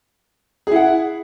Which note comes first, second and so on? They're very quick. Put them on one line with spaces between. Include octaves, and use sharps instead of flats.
G#4 E4 F#5